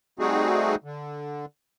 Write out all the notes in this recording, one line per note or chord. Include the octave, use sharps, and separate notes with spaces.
G3 A3 C4 D#4 F#4 G#4
D3